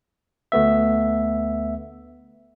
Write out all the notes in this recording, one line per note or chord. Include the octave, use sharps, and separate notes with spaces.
D2 A3 B3 E5